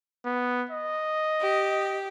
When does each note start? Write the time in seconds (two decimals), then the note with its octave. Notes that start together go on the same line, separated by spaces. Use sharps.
0.25 B3
0.71 D#5
1.40 G4